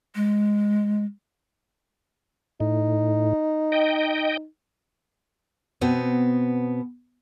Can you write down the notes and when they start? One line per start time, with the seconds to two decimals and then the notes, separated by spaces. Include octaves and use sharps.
0.15 G#3
2.60 A2 D#4
3.72 D#5 G5
5.81 B2 B3 C4